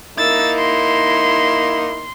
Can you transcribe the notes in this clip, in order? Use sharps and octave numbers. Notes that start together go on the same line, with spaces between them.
A#3 D#4 E4 E6 A6
C6